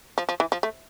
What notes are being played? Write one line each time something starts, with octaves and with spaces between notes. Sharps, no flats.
F3
F3
E3
F3
A3